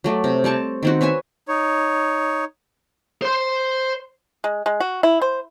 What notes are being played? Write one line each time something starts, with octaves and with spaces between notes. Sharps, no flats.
F#3 A3 D5
C3
G3 C4 A5 C#6
D#3 C4 F#4
B4 C#5 E5 G#5
D#4 C#5
C5 C6
G#3
G#3
F#4
E4
C5